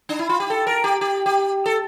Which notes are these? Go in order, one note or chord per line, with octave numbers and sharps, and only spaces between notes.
D4
E4
F4
G4
A4
A#4
G4
G4
G4
A4